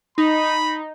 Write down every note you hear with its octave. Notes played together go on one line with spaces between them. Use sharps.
D#4 B5